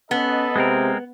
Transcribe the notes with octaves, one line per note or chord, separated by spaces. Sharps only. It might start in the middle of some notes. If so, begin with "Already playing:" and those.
B3 C#4 A4 B4 D#5
C3 G#3 C4 A#4